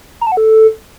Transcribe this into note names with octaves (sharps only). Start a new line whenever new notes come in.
A#5
A5
F#5
A4